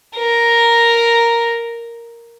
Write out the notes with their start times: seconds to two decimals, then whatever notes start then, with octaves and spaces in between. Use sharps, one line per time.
0.17 A#4 A#5